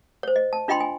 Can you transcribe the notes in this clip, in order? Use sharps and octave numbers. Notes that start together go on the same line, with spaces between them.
C5 C#5
D#5
A5
D4 F4 D#5 G5 B5 C6
G#5